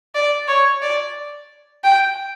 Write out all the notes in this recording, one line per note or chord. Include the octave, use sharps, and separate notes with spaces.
D5
C#5
D5
G5